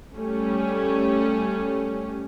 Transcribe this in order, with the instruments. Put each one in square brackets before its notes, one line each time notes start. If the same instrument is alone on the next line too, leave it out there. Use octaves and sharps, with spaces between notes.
[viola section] G3 A3 C#4